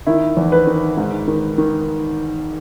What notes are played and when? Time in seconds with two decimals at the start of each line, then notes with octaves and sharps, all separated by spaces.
0.07 D#3 E4
0.37 E2
0.52 B4
0.67 D#3
0.97 G#2
1.28 D#3
1.58 D#3